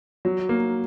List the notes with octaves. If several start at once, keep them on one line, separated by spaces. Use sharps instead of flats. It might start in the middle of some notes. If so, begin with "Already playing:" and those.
F#3
A#3